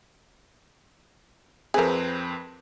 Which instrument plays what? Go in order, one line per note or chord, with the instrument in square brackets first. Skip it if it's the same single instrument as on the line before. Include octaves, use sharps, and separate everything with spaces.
[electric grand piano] F2 C4 B4 [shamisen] G#4 A#4